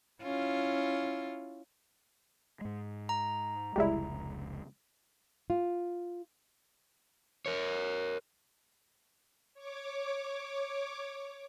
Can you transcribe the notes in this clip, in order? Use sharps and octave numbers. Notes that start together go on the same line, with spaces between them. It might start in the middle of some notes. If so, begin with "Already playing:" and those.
C#4 E4 F4
G#2 G#3
A#5
F1 C#2 G3 G#3 E4
F4
A#4 C#5
C#5 D6